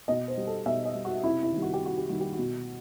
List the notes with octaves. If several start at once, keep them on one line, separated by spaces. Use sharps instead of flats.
B2 D#5
C5
G3
A4
B2 E5
D#5
G3
F#4
C3 E4
E4
D#3
G3
F#4
G4
C3 F#4
G4
D#3 G3 F#4
G4
F#4
B2